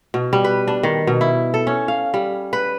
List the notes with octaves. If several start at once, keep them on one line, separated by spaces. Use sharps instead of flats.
B2
G3
B4
D4
D#3
B2
E4
A4
C#4
F5
G3
B4